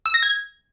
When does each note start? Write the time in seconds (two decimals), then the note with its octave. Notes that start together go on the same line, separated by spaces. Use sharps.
0.06 E6
0.14 A#6
0.23 G#6